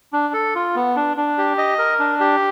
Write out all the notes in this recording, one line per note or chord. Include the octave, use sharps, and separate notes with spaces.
D4
A4
F4
B3
D4
D4
G4
D#5
A#4
D4
G4